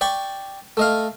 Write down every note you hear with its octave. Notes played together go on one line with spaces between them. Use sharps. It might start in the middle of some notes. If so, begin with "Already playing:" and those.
D5 G5 B5 C#6
A3 D#5 F5